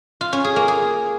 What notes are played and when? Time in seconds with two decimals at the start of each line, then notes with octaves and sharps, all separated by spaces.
0.21 F4
0.33 C#4
0.44 G#4
0.56 A#3
0.68 G#4